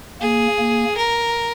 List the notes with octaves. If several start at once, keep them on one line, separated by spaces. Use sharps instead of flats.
A#3 G#4
A#3
A#4